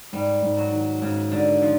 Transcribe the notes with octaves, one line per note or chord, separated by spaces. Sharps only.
G#2 G3
G#2
F#3
D#3
G#2 C#3
G#2 D3
D#3 F3